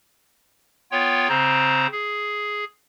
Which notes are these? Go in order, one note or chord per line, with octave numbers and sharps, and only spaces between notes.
B3 F4 C#5 G5
C#3 C4 C5 A#5
G#4